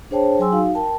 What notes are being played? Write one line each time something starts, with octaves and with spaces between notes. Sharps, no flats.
D4 G#4 C5 C#5 G5 A5
F#3 G#4 G5 G#5 C6 E6
D#4 F#4 F5
A#4 G5 A5